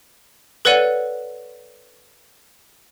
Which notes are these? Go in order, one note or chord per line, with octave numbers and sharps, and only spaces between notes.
A4 B4 C#5 D5 F#5 D#7